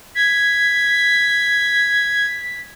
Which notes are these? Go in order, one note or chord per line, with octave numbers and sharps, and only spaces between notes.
G#6 B6